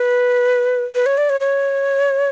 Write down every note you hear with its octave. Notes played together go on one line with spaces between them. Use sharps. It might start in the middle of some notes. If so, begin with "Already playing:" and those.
Already playing: B4
B4
C#5
D5
C#5
C#5